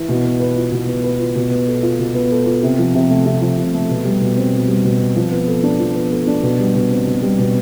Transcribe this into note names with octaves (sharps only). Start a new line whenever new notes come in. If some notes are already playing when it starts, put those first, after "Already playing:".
Already playing: E3
B2
B3
B4
F4
B2
B3
B4
F4
B2
B3
A4
F4
B2
B3
A4
F4
C3
F3
C3
A3
C3
F3
C3
A3
B2
G3
B2
C4
B2
G3
B2
C4
F3
B3
A4
D4
F3
B3
A4
D4
B2
G3
B2
C4
B2
G3
B2